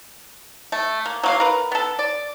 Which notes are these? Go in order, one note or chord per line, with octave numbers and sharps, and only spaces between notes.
A3
A#3
F#3 A#3 F5
A#4 B4
B3 A4
D5